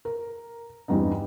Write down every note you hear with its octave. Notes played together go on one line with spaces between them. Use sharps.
A#4
E2 G2 G3 C4 D#4